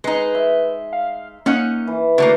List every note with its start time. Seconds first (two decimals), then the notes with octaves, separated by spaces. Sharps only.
0.04 G#3 D#4 B4
0.35 E5
0.93 F5
1.46 A#3 C#4 D#4 F#5
1.87 E3
2.18 D3 A3 A#3 F#4